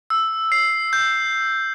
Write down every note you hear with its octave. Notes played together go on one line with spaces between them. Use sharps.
E6
C7
G6